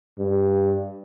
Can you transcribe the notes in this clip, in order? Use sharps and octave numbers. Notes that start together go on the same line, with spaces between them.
G2